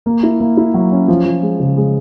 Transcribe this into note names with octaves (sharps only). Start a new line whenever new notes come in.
A#3
E4
A#3
E4
F#3
C#4
F3
F3
G#3
C#3
G#3